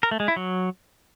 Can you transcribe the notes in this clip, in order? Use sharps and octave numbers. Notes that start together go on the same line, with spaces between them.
A#4
A3
G#3
E4
F#3